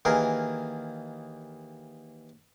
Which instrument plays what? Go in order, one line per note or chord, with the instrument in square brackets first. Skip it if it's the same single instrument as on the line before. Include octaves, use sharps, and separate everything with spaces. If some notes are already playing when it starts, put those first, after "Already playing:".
[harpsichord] D#2 E3 G#4 A#4